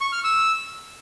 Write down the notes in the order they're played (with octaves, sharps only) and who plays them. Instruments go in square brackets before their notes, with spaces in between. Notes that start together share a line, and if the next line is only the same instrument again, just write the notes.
[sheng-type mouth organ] C#6
F6
E6